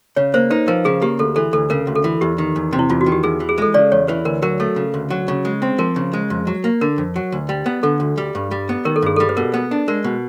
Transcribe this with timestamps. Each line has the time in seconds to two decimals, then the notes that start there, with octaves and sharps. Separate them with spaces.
0.16 C#3 C#5
0.34 A#3 C5
0.51 D#4 B4
0.68 F3 A#4
0.85 C#3 G#4
1.02 A#3 G4
1.19 D2 A4
1.36 E3 A4
1.53 D2 A4
1.70 C#3 A#4
1.87 D2
1.95 A4
2.04 E3
2.21 E2 G4
2.38 D#3
2.56 E2
2.73 C3
2.79 E4
2.90 E2 F4
3.01 F#4
3.06 D#3
3.12 G4
3.23 E2 G#4
3.40 E3
3.49 G#4
3.58 G#3 A4
3.74 C#3 D5
3.92 E2 C#5
4.08 E3 B4
4.25 D2 A#4
4.42 F#3 A#4
4.60 A3 A4
4.76 C#3
4.94 D2
5.10 F#3
5.28 C#3
5.45 G#3
5.62 C4
5.78 F3 A#4
5.96 C#3
6.13 G#3
6.30 F2
6.47 F#3
6.64 A#3
6.81 D3 A#4
6.98 F2
7.16 F#3
7.32 D2
7.49 G3
7.66 B3
7.83 D3 A4
8.00 D2
8.18 G3
8.35 G2
8.51 G3
8.69 B3
8.85 D#3 A#4
8.96 A4
9.02 G2 G#4
9.16 G3 A4
9.29 B4
9.37 B2 A#4
9.54 B3
9.71 D4
9.88 G#3 A#4
10.04 B2